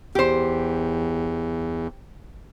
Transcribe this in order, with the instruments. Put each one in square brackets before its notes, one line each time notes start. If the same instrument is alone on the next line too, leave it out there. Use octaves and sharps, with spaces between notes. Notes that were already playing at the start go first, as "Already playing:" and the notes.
[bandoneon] E2 [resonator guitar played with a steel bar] G4 C5